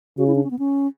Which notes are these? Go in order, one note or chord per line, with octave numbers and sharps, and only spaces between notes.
C#3 F#4
E4
D4
C#4
B3
C#4